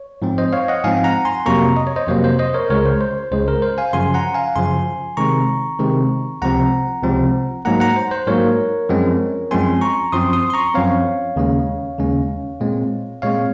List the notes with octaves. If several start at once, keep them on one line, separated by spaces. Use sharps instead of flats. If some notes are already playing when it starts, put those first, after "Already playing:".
Already playing: C#5
G#2 F3 C4
C5 D#5
C#5 F5
D#5 F#5
G#2 F3 C4 F5 G#5
F#5 A#5
G#5 C6
F2 C3 F#3 A#3 A#5 C#6
D#5
C#5
C5 D#5
F2 C3 F#3 A#3 C5
C5
C5 D#5
A#4 C#5
C#2 C#3 G#3 A#4 C#5
C5
C5
C#2 C#3 G#3 C5
A#4
C5
F5 G#5
F#2 C#3 F3 G#5 C6
F#5 A#5
F5 G#5
F#2 C#3 F3 G#5 C6
C3 D#3 G#3 C4 A#5 C#6
C3 D#3 G#3 C4
C#2 C3 F3 C4 F#5 A#5
C#2 C3 F3 C4
G#2 F#3 A#3 F#5 A#5
F#5 A#5
C5
C5
G#2 F#3 A#3 A#4 C#5
F#2 F3 G#3 C4
F#2 F3 G#3 C4 G#5 C6
A#5 C#6
F#2 F3 C4 C6 D#6
C6 D#6
C6
A#5 C#6
F#2 F3 C4 C#5 F5
D#2 C#3 G#3 C#4
D#2 C#3 G#3 C#4
A#2 G#3 C4
A#2 G#3 C4 C#5 F5